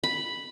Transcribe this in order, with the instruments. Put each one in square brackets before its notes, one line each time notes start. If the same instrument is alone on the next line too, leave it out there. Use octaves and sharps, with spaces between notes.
[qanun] B5